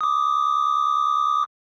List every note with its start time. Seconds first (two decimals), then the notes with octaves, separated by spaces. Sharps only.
0.01 D6 D#6